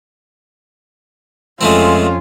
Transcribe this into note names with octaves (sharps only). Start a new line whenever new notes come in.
F2 G#3 A3 C4 C#4 F4